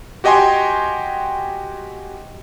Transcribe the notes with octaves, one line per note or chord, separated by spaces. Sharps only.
F#4 G4 D#5 G5 G#5 C6